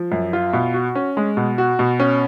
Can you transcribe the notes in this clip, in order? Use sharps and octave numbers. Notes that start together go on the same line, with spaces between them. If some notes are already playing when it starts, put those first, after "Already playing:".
Already playing: F3
F#2
F4
B2
F#4
C#4
G#3
B2
F#4
B2
C#4